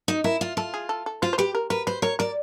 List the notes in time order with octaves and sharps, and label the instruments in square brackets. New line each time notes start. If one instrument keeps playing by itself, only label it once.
[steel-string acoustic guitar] D#4
[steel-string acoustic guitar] E4 [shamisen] A#4
[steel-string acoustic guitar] F4
[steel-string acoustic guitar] F4 [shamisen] A4
[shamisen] G#4
A4
A4
[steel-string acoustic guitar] F4 [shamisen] C5
[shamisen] C5
[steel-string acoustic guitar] G4 [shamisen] B4
[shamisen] A#4
[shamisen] A#4 [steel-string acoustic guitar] B4
[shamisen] B4 [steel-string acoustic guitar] C5
[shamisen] A#4 [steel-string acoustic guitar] C#5
[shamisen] A#4 [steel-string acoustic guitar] D5